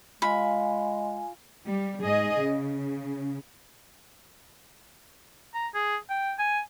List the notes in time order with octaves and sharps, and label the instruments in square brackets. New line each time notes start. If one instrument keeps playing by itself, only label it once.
[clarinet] G#3 [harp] F4 [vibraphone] G#5 [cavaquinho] B5
[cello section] G3
G#2 G#4 D#5
C#3
[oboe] A#5
G#4
G5
G#5